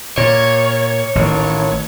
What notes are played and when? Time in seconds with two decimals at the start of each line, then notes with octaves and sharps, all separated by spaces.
0.18 A#2 C#5
1.15 A1 D#3